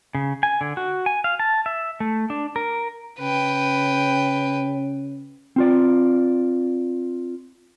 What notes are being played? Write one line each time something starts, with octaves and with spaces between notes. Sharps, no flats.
C#3
G#5
D3
F#4
G#5
F5
A5
E5
A3
D4
A#4
C#3 B4 G5
C4 F4 D5